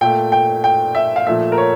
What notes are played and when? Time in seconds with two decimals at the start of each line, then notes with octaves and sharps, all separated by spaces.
0.01 A#2 A3 G5
0.32 G5
0.64 G5
0.95 E5
1.16 F5
1.27 A#2 F3 A3 E5
1.52 A#4
1.58 C#5